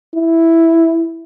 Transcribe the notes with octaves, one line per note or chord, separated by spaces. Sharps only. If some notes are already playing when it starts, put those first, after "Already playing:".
E4